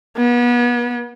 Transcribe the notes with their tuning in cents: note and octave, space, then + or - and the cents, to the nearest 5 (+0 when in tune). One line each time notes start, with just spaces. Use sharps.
B3 -35